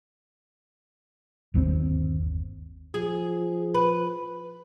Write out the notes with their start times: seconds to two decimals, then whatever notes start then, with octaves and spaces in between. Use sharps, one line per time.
1.54 G1 D#2 C3 C4
2.94 F3 G#4
3.74 B4